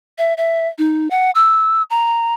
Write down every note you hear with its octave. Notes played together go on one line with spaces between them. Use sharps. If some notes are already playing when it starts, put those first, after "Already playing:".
E5
E5
D#4
F#5
E6
A#5